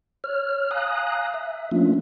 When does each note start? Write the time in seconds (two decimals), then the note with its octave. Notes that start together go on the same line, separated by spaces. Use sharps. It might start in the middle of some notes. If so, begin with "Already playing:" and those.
0.24 C#5 F6
0.71 F5 G#5 A#5 D#6 F#6
1.34 E5
1.71 F3 A3 A#3 C#4 D4 F4